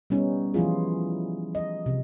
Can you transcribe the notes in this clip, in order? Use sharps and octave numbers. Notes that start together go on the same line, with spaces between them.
G3 B3 C#4 D#4
E3 F3 E4 F4 G#4
D#5
C3